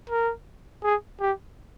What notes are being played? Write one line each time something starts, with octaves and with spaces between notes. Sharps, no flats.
A#4
G#4
G4